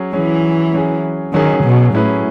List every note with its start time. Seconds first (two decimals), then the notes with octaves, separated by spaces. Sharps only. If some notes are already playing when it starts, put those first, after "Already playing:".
Already playing: F#3 C#4 G#4
0.13 E3 F#3 C#4 G#4
0.73 F#3 C#4 G#4
1.33 D#3 F#3 C#4 G#4
1.64 B2
1.93 A2 F#3 C#4 E4 G#4 B4